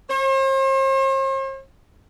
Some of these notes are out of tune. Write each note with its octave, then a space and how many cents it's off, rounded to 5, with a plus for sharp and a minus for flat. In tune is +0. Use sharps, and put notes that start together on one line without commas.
C5 +45